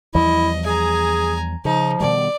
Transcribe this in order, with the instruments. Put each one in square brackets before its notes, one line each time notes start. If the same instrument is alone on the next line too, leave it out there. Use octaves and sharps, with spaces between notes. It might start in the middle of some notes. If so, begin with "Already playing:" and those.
[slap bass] E2 F3 G3 [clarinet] E4 [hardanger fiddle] D#5
[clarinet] G#4 [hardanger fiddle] G#5 A#5
[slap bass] C#3 [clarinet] F3 [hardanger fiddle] D#4
[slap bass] B2 D#3 G3 [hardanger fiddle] D5